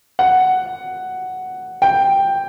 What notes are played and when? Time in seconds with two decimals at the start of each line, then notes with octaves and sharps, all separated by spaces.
0.19 F#5
1.82 G5